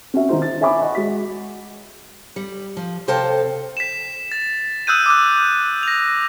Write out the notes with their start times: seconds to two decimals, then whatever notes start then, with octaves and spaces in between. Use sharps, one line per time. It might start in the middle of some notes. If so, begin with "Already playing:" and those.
0.14 C#4 F#4 E5
0.29 D#3 D#4 F4 C5
0.42 A6
0.61 C#5 E5 G#5 B5 D6
0.81 D#5 F#5 C#6
0.95 G#3 F#4 B6
2.36 G3
2.77 F3
3.08 C3 A4 C5 F5 G5 A5
3.77 B6 E7
4.32 A6
4.87 D#6 E6 F#6 G6 D#7
5.06 D6 F#6
5.83 A#6 F7